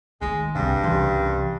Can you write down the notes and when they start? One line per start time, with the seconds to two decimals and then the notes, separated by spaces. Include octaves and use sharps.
0.21 D#3 G#3 A3
0.55 C2 G2 C3 G3
0.83 C2 C#3 E3 G4 C6